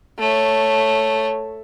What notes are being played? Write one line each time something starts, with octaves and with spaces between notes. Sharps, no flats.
A3 C#5